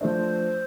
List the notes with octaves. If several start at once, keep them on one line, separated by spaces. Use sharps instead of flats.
F3 A3 D4 C5